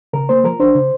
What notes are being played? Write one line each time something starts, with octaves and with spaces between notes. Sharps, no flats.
C#3 A#4
A#3 C5
F3 A#4
D4 C5
C#3